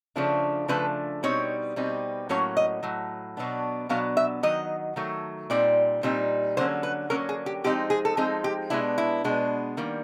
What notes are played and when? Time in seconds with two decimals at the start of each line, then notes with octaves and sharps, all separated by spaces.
0.16 C#3 F3 A3 D4
0.68 C#3 F3 A3 D4 B4
1.23 B2 G3 C4 D#4 C#5
1.76 B2 G3 C4 D#4
2.29 A2 F#3 A#3 C#4 C#5
2.57 D#5
2.83 A2 F#3
3.37 B2 F#3 B3 D4
3.89 B2 F#3 B3 D4 F5
4.17 E5
4.43 D#3 F#3 D#5
4.96 D#3 F#3 A3
5.50 A#2 G3 C4 D#4 D5
6.03 A#2 G3 C4 D#4
6.57 D3 F#3 A#3 C#4 C5
6.83 B4
7.10 D3 F#3 A#3 C#4 A#4
7.29 G#4
7.46 G4
7.64 F3 G#3 C4 D#4 G4
7.90 G#4
8.05 A4
8.17 F3 G#3 C4 D#4 G#4
8.44 G4
8.70 B2 G#3 B3 D4 E4
8.98 E4
9.24 B2 G#3 B3 D4
9.77 D#3 G3 A#3